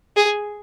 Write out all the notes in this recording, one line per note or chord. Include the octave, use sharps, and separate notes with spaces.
G#4